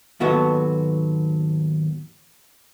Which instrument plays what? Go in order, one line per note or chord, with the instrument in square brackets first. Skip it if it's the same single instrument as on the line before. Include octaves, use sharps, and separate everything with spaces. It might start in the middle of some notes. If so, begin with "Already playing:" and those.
[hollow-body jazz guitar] D#2 G#2 F#3 B3 F#4 A4